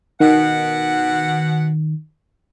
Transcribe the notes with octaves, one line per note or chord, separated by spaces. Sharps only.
B2 D#3 F#5